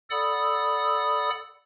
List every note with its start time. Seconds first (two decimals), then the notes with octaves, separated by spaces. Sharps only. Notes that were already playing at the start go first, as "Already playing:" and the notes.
0.10 A4 D5 F#5 B5 D#6 E6